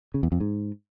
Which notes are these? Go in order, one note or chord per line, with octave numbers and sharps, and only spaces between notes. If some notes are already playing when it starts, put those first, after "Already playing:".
C#3
E2
F2
G#2